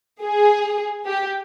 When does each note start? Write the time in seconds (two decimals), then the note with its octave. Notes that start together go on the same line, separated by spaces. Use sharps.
0.22 G#4
1.06 G4